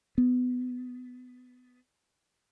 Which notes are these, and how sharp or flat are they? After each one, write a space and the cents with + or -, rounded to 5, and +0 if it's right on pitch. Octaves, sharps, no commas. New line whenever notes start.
B3 +20